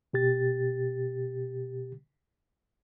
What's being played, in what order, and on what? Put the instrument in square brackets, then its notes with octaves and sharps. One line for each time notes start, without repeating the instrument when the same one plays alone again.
[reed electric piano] B2 G4 A6